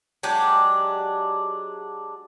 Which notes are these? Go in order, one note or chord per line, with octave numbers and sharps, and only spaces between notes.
F#3 G#3 D4 G4